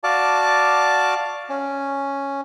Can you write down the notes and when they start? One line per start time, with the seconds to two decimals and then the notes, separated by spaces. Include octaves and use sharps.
0.04 F#4 D5 F5 A5 D6
1.49 C#4